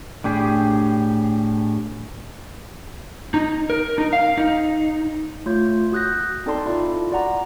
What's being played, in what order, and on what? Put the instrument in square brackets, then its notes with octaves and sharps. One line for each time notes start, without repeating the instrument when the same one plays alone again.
[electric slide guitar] A2 D4 G4 G#4
D#4
A#4
D#4
F5
D#4
[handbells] A3 F4 C#5 G6
F#4 D#6 F#6 G6 A#6
C4 D#4 A4 D5 A5 C6
E4 F4 D5
F#4 D5 F#5 A#5